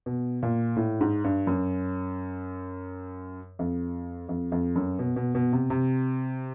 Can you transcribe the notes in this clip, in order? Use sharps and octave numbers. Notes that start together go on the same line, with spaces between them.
B2
A#2
A2
G#2
G2
F#2
F2
F2
F2
F#2
B2
B2
B2
C3
C3